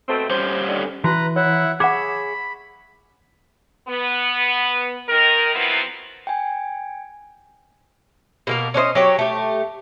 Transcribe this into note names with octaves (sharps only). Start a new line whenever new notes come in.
B2 A3 C4
G3 C#4 C5
D3 D#3
E3 F#4 B4 A#5
E4 C#5 E5 F#5
G#4 C#5 E5 F#5 B5 D6
B3
D#3 A#4
F3 F#3 B3 C4 E4
G5 G#5
B2 A#3 A#4
C#4 D4 C5 D#5
F#3 G4 C#5
A3 G4